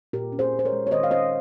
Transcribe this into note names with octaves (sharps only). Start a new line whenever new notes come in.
A#2 G4 A#4
C#4
G#4 C5
A#2
C5
A#4 C#5
G#3
C#5
D#3 C5 D#5
F5
C#4 C5 D#5